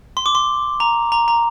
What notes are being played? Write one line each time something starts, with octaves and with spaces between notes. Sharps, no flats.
C6
D6
C6
A#5
A#5
A#5